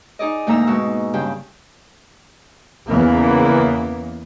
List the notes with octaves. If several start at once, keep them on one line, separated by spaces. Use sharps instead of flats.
D#4 G#4 D5 D#5
D2 G#2 A#3 D#4 A#5 E6
B2 G#3 C#6 E6
G2 C#3 G5
E2 C#3 E3 A#3 B3